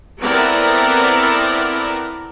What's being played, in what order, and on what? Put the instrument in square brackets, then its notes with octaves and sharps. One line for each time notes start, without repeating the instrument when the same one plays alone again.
[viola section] B3 C4 E4 A4 A#4 D5